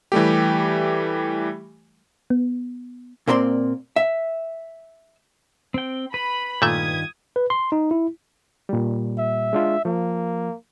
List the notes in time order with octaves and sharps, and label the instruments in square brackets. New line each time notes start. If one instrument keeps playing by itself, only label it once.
[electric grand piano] E3 G3 A3 G4
[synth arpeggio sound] B3
[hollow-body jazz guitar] A#2 A#3 C4 D5 A#5 C6
E5
[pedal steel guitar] C4 G5
[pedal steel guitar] B4 [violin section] B5
[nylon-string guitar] G2 D#3 F4 [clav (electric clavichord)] A#2 A3 E5 [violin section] D#6 G#6
[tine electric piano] B4
C6
D#4
E4
[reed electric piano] A#2 G3
[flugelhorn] E5
[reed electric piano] G#3 D4 F4
[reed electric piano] F3 [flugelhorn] A#3